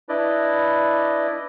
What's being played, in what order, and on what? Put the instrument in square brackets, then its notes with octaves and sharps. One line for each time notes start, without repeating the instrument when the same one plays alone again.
[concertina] D4 E4 B4 D5 D#5